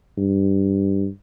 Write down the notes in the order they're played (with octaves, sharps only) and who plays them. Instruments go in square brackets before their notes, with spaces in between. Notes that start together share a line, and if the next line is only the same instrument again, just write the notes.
[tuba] G2